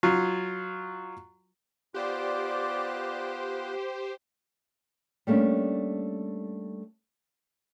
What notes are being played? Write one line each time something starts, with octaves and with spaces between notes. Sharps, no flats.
F#3 F4
B3 F4 G4 C5 D5 D6 F#6
G3 A3 A#3 C#4 D4